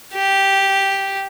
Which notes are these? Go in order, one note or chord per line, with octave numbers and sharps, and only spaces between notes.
G4